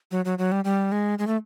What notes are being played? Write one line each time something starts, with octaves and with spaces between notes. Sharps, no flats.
F#3
F#3
F#3
G3
G3
G#3
G#3
A3